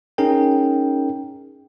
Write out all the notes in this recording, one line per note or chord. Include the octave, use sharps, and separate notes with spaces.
C#4 D#4 G#4 A#4 G5